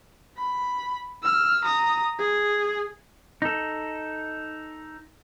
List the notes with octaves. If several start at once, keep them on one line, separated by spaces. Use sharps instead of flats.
B5
E6 F6
A#5 D#6
G#4
D#4 A4